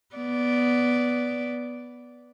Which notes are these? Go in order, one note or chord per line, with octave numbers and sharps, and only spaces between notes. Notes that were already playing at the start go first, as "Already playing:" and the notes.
B3 D5